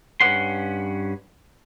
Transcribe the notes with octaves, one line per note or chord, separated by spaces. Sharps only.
G2 C#4 B4 D5 F#5 C6